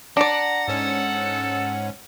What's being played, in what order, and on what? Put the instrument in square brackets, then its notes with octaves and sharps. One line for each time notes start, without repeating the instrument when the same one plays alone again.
[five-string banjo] D4 D5 [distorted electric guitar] F#5 [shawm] A#5
[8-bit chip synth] G#2 C#4 [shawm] A4